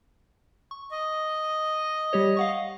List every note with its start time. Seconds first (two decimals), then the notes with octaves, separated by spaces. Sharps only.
0.71 C#6
0.91 D#5
2.13 G3 G4 C#5
2.37 F5 F#5 C#6